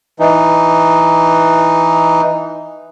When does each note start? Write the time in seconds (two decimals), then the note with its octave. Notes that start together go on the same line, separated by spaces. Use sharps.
0.20 E3 D#4